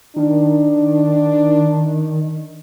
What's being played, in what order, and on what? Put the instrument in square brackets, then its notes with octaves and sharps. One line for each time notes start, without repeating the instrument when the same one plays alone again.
[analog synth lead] D#3 [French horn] D4